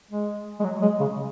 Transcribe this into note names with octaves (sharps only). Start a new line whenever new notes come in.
G#3
G#3
F#3
G#3
C#3